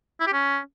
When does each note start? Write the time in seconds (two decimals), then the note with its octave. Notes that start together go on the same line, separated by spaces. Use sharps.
0.20 E4
0.27 G4
0.33 C#4